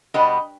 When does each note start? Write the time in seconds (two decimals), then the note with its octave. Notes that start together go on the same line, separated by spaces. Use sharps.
0.14 B2 G3 B3 D4 D#5